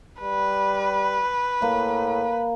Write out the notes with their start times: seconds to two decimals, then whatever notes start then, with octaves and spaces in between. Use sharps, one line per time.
0.21 G3 B4
1.62 A2 A#3